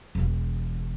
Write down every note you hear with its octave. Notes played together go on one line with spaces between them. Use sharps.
E1 E3